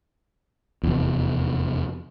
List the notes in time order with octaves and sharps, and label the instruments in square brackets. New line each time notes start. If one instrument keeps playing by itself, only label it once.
[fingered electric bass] F1 E2